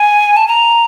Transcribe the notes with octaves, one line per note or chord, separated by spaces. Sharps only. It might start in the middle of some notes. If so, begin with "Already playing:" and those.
Already playing: G#5
A5
A#5